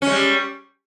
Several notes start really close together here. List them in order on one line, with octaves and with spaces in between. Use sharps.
C#4 G#3 G3